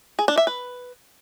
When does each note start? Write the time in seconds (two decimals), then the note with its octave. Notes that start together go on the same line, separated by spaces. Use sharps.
0.19 G#4
0.28 D4
0.38 E5
0.47 B4